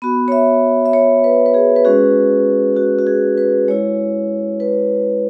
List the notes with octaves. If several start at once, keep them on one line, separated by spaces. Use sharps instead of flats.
B3 F#4 B5
C#5
E5
E5
C#5
B4
B4
G#4
B4
G#3 C#4 F#4 G#4
F#4
F#4
G#4
B4
G#3 E4 C#5
B4